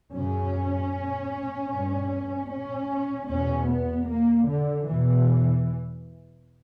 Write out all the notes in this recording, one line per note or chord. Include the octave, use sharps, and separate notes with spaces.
F#2 C#3 C#4
G2
C#4
E2 B2 C#4
B3
A#3
D3
E2 B2 E3